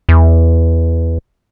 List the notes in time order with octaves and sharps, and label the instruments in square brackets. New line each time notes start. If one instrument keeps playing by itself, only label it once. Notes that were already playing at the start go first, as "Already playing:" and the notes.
[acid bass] E2